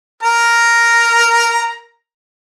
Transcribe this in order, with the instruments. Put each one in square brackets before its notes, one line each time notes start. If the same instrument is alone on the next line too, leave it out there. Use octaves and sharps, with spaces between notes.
[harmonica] A#4 A#5